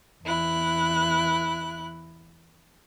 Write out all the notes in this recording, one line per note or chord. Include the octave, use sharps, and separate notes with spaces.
E2 E4 F#6